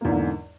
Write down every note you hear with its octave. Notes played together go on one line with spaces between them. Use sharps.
E2 G#2 D3 A#3